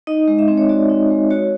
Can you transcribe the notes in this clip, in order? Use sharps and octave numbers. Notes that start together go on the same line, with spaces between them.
D#4 D#5
G#3
E5
C4
C#5
F#4 D5
D#4
G#3
F#4 C#5